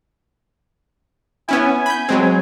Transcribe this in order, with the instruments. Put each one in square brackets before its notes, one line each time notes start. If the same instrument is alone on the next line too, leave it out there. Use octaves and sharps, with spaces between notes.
[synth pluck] B3 C#4 E4 [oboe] G#5
[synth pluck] B5 G6
F#3 G#3 C4